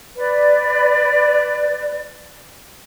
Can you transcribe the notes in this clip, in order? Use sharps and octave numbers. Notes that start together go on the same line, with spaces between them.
B4 D5